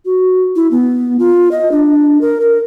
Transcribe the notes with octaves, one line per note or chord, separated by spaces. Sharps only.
F#4
E4
B3
F4
D#5
D4
A#4
A#4